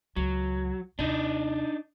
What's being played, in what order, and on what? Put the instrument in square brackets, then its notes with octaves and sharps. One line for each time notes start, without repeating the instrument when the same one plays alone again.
[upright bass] C#2 [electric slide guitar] F#3
[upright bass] D#2 C3 [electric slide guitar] D4 D#4